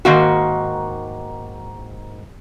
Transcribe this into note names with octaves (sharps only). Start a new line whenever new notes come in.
G#2 D#3 A#3 F#4